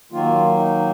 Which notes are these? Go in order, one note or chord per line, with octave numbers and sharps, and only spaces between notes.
D#3 F#3 A#3 F4
D#4